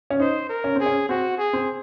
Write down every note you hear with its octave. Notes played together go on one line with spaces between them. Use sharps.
C#4
D#4 C5
A#4
C#4
C4 G#4
C#4
C4 F#4
G#4
C4